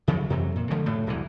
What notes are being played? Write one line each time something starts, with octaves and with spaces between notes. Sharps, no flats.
D#2 C#3 F3 F#3
F2 C3 E3 F#3
A#2
D3 F3 G#3 A3
F1 A2 A3
D1 C2 E3